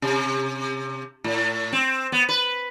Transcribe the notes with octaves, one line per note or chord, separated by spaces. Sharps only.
C3
A2
C4
B3
B4